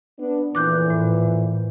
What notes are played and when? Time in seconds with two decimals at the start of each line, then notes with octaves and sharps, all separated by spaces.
0.19 B3 D4
0.55 F2 A#2 E3 D6 F#6 G6
0.90 A2